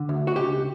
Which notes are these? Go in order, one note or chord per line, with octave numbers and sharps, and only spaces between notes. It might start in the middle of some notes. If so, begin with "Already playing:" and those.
Already playing: D3
D2
F#4
C#2 G4